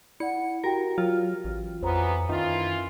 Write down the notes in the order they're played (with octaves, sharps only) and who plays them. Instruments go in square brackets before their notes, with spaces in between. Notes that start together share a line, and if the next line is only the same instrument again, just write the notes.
[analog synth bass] E4 [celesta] D5 F#5 [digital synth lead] C#7
[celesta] F#4 G4 G5 [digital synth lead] A#4
[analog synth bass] F#3 [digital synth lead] F4
[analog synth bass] A1
[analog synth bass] F2 [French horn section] E3 F#3 B3 [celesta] C5 A#5 C6
[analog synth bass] F#2 [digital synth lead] D#3 [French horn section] E3 E4 F4